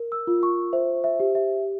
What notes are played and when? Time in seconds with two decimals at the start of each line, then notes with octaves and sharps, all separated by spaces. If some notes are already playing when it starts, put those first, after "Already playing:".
Already playing: A#4
0.12 E6
0.27 F4
0.43 C#6
0.73 C5 E5
1.04 E5
1.20 G4
1.35 E5